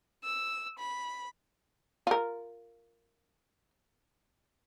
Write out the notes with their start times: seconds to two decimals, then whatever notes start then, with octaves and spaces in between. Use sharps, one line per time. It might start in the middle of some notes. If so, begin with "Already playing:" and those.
0.24 E6
0.78 B5
2.07 F4 A#4